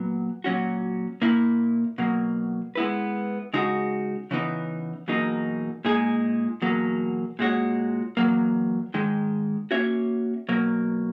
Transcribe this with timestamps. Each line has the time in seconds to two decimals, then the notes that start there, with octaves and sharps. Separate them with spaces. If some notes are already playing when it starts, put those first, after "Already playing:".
Already playing: A#2 F#3 B3
0.44 A#2 F#3 C#4 F#4
1.22 A#2 A#3 E4
1.98 B2 F#3 A#3
2.75 G#3 B3 E4 B4
3.53 C#3 G#3 D#4 F#4
4.31 C#3 E3 B3 D#4
5.08 E2 B2 F#3 A#3 D#4
5.85 A#2 G#3 D#4 G#4
6.62 E2 B2 F#3 A#3
7.39 A#2 G#3 C#4 F#4 C#5
8.17 E2 B2 F#3 A#3
8.94 G#2 D#3 G#3
9.71 A#3 C#4 F#4 C#5 E5
10.49 B2 F#3 A#3